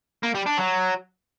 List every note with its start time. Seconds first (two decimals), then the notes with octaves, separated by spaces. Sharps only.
0.23 A#3
0.35 G3
0.46 D4
0.57 F#3